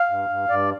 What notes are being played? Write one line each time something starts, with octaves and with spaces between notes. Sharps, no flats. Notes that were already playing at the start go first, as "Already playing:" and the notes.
Already playing: F5
G2
G2
G2 D5